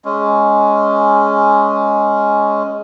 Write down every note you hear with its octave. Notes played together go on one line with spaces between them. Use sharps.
G#3 C#4